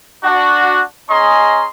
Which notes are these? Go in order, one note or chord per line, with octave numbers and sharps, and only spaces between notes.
D4 F#4
C#4 G#4 D#5 G#5 A#5 C6